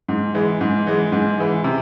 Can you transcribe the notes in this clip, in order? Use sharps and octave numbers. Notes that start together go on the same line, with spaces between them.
G#2
E3 G#3
G#2
E3 G#3
G#2
E3 G#3
C3